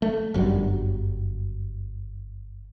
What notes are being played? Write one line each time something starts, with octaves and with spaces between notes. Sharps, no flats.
A3
G1 F#2 F#3 G3